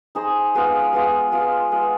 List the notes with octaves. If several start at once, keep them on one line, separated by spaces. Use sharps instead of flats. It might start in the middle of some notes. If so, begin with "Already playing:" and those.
D#4 G#4 C5 D#5
G#3 B3 F4
G#3 B3 F4
G#3 B3 F4
G#3 B3 F4